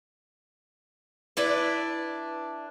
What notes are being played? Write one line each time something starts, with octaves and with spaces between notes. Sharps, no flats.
D4 E4 B4